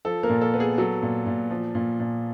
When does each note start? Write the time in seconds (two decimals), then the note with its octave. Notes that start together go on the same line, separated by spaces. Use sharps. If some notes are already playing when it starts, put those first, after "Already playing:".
0.05 F3 A4
0.23 A#3 A#4
0.29 A#2
0.41 A4
0.54 B3
0.60 G#4
0.78 F#3 A4
1.03 A#2
1.26 A#2
1.51 F3
1.75 A#2
2.00 A#2